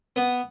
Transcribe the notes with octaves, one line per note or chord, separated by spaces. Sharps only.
B3